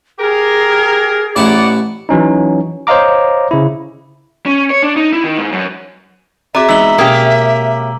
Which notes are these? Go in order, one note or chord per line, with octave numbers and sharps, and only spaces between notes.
G4 G#4 A#4
A1 D#4 E4 D5 F#5 A5
E3 F#3 C#4 D#4
C5 C#5 D#5 F5 A#5 D6
C#3 E4
C#4
C#5
D4
D#4
E4
D#3
G#2
F#2
C4 F#4 G#4 D5 E5 A#5 D6
E2 G#3 D#4 E6 F#7 G7
B2 A#3 C#4 G4